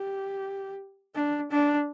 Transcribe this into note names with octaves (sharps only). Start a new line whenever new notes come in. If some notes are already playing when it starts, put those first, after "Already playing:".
Already playing: G4
D4
D4